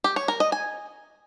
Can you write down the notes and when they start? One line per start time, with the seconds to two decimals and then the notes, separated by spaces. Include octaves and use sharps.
0.04 G4
0.16 C#5
0.28 A#4
0.40 D#5
0.52 G#5